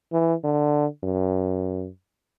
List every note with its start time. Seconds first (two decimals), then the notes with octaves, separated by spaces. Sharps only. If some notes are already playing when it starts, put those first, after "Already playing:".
0.13 E3
0.44 D3
1.03 F#2